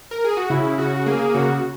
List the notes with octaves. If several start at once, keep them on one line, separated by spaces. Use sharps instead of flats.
A#4
G#4
F#4
C#3 E4
C#3 F#4
A#3 G#4
C#3 F#4